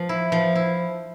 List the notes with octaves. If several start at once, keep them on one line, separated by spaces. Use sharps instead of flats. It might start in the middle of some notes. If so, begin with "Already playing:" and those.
Already playing: F3
E4
F3
E4